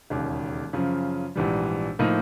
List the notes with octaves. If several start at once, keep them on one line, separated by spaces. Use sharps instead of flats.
E1 D#2 C#3
F#2 C#3 F3
A#1 G#2 E3 G3
A2 F3 A#3 D#4